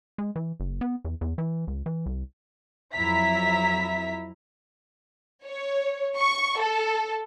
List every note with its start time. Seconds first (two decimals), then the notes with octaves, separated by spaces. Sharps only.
0.18 G#3
0.36 E3
0.60 F#1
0.81 B3
1.05 E2
1.21 E2
1.38 E3
1.67 C#2
1.86 E3
2.06 C2
2.94 F2 F#3 E4 E5 A#5 B6
5.45 C#5
6.18 C#6
6.60 A4